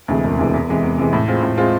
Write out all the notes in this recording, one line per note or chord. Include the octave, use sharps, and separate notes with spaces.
D2 C3 E3 G#3
E1
D2 C3 E3 G#3
E2
C3 E3 G#3
E2
C3 E3 G#3
A2
G#3 C4 F4
A2
G#3 C4 F4